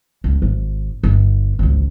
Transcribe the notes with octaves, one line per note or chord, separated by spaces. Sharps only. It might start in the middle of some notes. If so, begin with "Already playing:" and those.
C#2
G#1
G1
G#1 C#2